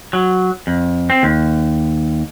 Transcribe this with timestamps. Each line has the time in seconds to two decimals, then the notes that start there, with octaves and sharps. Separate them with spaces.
0.13 F#3
0.67 F2
1.10 C4
1.23 D#2